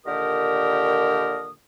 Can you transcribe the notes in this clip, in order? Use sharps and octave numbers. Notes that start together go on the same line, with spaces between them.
A#2 D3 D#3 G4 A#4 D#6